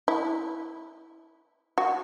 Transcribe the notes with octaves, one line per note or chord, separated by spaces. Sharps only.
E4
F#4